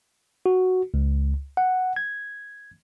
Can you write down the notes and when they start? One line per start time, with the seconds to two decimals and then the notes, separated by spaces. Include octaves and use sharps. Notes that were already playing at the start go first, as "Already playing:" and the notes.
0.46 F#4
0.94 C#2
1.57 F#5
1.96 G#6